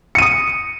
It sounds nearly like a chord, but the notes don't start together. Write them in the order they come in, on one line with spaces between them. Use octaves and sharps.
C#7 D#7 D#6